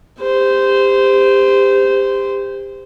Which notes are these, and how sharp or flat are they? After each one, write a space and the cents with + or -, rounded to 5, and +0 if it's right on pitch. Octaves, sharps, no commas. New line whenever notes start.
G4 +30 C5 -15